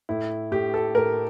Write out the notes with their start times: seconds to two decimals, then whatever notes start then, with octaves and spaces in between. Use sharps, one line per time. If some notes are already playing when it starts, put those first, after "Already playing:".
0.09 A2 E4
0.52 A2 G4
0.74 A4
0.95 A2 A#4